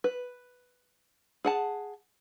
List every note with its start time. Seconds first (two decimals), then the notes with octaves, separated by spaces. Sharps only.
0.04 B4
1.45 G#4 F#5 A5